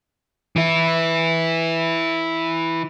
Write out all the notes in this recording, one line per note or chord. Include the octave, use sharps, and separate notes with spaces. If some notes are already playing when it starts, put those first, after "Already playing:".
E3 E4